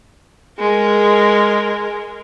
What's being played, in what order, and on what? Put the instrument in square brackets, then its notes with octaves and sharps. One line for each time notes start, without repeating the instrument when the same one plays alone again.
[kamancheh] G#3 A#4